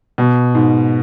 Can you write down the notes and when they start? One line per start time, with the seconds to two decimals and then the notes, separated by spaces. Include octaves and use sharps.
0.18 B2
0.55 G#2